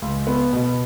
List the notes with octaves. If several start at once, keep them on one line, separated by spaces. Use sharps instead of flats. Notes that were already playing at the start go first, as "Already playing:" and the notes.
C#2
B3
B2